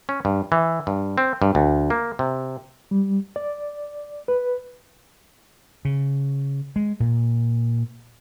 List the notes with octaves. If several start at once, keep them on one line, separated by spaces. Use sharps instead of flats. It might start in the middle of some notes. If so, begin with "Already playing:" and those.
C#4
G2
E3
G2
C4
G2
D2
A#3
C3
G3
D5
B4
C#3
G#3
A#2